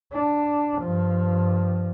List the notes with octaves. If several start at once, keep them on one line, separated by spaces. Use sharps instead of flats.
D4
G2 F3